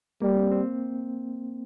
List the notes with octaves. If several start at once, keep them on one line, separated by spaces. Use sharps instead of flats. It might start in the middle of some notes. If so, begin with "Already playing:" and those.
G3 A#3
C4
C4